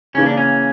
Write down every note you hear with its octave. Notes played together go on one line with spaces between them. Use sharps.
C#3 E3 A#3 C#4
D4
C#4